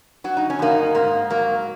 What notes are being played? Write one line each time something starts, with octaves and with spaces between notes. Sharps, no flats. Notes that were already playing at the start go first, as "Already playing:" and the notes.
F#3 F#4
D#4
C#4
F#2 A#3 D#4
G#2 A#3
F#3 A#3